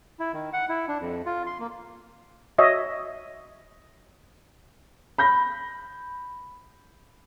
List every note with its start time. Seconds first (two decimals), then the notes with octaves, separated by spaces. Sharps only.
0.20 E4
0.33 D#3
0.53 F#5
0.69 E4
0.88 D4
1.00 F2
1.26 F4
1.46 C6
1.60 A#3
2.58 F#4 C#5 D#5 E5
5.18 B5 G6 A#6